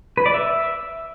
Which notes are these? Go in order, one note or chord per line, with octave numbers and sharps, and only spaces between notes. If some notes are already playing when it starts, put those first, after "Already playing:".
B4
D5
E5